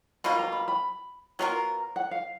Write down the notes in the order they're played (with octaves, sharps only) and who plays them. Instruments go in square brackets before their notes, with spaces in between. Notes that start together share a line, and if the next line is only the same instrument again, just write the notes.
[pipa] B2 A#3 F4 [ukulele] B5
[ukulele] A#5
B5
B5
[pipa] F#3 B3 F4 A#4 [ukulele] A#5
[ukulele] F#5
F5